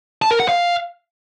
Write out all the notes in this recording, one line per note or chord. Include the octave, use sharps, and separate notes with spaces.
A5
A#4
F#5
F5